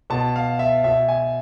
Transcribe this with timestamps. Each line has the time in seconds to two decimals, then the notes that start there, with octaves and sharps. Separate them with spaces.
0.10 B2 A5
0.36 F5
0.59 E5
0.84 B2 E5
1.09 G#5